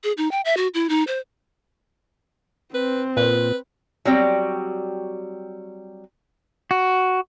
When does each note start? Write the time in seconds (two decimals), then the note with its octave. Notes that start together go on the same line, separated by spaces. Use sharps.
0.04 G#4
0.17 D#4
0.31 G5
0.45 E5
0.57 F#4
0.74 E4
0.89 D#4
1.07 C5
2.74 C4 B4
3.17 A#2 B4
4.05 F#3 G3 C4 G5
6.71 F#4